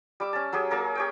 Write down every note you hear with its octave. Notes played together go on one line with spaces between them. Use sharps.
G3 D6 E6
C#4 A5
F#3 C#4 G4 G#4
A#3 C#4 G#4 A#4
G4 C#5 G5